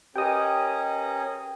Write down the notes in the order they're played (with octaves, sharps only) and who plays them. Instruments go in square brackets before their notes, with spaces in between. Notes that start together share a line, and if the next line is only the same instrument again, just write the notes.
[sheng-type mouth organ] C#4 G#4 A#4 [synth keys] G4 B4 D#5 [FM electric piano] G5 D#6